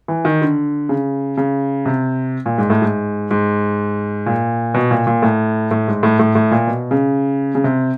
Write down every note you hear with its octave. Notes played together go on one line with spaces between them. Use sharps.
E3
D#3
D3
C#3
C#3
C3
A#2
G#2
A2
G#2
G#2
A#2
B2
A#2
A#2
A2
A2
G#2
A2
A2
A2
A#2
B2
C#3
C#3
C3